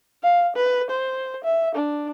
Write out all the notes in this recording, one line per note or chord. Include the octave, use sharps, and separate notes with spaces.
F5
B4
C5
E5
D4